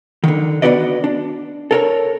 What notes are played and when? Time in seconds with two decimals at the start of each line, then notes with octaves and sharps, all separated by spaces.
0.24 D3 D#3
0.62 B3 D4 F#4 B4 D5 D#5
1.04 D4
1.71 A4 A#4 C#5